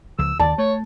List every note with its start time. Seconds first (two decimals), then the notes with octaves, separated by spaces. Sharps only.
0.19 C#2 F3 E6
0.40 D#2 D#3 D5 A5
0.58 A3 C#5